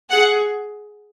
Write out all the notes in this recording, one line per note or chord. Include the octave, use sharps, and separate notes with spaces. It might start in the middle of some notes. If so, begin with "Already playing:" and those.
G#4 F#5